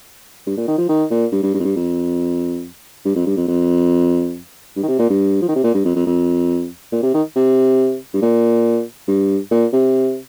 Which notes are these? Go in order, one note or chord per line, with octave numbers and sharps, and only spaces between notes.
G2
A#2
D#3
F3
D#3
A#2
G2
G2
G2
F2
G2
F2
G2
F2
G2
F2
F2
G2
D#3
C3
A#2
G2
F3
D#3
C3
A#2
G2
F2
F2
F2
A#2
C3
D#3
C3
G2
A#2
G2
A#2
C3